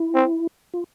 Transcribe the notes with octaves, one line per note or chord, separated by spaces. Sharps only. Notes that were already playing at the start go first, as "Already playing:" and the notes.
Already playing: E4
C4
F4